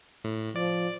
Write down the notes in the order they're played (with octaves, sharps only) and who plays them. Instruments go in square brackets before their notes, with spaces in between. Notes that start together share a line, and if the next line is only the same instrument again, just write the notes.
[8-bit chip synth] A2
[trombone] F3 [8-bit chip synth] D5